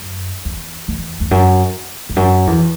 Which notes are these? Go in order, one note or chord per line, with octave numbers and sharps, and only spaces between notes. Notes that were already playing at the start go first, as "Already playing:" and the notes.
Already playing: F#2
E2
E2
E2
F#2
E2
F#2
E2